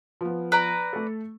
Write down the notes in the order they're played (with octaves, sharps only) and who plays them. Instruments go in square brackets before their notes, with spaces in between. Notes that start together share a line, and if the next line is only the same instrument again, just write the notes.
[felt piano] F3 B3
[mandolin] B4 D5 A#5
[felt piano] A3 A4